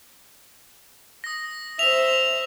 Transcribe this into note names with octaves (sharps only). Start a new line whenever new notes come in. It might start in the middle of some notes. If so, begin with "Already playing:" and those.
D#6 A#6
C5 E5 F7